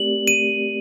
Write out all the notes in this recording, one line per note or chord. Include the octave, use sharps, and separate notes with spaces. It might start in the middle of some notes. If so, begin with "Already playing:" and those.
Already playing: A3 C4 G4 A#4 D5 F#7
D#7